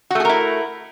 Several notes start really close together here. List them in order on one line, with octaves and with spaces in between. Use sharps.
F#4 A3 G#4 A#4 E4